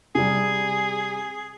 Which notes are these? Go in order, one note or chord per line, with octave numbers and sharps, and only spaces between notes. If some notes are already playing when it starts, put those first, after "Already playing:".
C3 G3 G#4